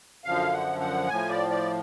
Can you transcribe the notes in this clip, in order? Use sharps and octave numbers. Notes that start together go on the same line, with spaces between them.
F#2 D3 F3 F5
F#5
F#5
A2 F3 G#5
D5
D5